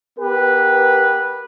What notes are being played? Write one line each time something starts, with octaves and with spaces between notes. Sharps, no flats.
B3 G4 A#4 B4